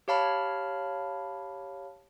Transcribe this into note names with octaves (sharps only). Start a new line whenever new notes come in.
G4 C#5 F5 A5 B5 F6